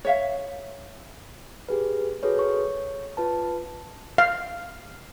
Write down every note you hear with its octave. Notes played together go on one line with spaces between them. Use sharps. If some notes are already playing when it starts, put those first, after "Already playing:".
C#5 E5 F5
G4 G#4 B4
F#4 G#4 A4 B4 C#5
C#5 C#6
F4 B4 A5
F5